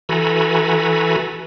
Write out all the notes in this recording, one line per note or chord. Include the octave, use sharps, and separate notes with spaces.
E3 F#4 A4 G#5 A#5 B5